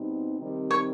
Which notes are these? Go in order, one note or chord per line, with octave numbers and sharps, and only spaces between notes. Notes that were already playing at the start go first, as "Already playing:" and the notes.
Already playing: B2 G3 C4 D#4
C3 D#3 G3 C4 D#4
C#5